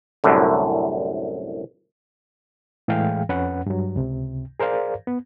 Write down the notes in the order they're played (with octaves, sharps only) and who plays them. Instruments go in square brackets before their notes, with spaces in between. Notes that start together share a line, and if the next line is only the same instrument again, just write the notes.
[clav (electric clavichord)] C2 F#2 A2 D3
[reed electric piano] A2 E3 G#3 G#4 F5 G5
F2 C#4 B4 F#5
G2 F#3
C#2 C3
G#4 A#4 C5 D5 F5
B3